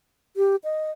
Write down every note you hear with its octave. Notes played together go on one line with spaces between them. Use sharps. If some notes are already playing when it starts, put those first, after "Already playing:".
G4
D#5